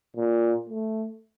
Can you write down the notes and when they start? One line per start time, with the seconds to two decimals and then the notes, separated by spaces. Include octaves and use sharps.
0.17 A#2
0.69 A3